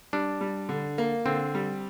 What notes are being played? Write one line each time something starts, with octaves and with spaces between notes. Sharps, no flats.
G3 D4
G3
D3
A#3
D3 C4
G3